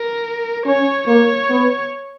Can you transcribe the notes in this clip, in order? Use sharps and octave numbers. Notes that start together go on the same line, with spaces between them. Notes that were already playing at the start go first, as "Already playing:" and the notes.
Already playing: A#4
C#4 C#5
A#3 C#5
B3